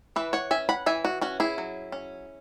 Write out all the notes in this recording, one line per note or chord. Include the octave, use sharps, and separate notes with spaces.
E3 B4 E5
C#5 F#5
C#4 E5 G#5
F#5 B5
E3 E5 G#5
F#4
C#4 F#4
E4 G#4
F#3
C#4